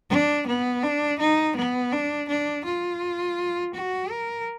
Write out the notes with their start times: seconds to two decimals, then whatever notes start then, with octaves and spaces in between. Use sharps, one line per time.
0.10 D4
0.47 B3
0.83 D4
1.20 D#4
1.56 B3
1.92 D4
2.29 D4
2.65 F4
3.74 F#4
4.11 A#4